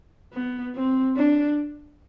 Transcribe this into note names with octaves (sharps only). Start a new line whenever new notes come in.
B3
C4
D4